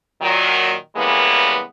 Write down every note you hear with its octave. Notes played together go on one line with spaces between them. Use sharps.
A#2 D#3 F#3
C#3 E3 G3 G#3 A#3 B3